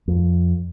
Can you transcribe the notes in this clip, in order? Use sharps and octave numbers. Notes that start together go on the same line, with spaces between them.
F2